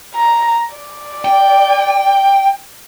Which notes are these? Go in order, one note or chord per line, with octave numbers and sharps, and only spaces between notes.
A#5
D5
G5